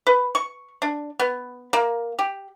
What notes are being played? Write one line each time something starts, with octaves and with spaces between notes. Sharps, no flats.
B4
C#6
D4
B3
A#3
G4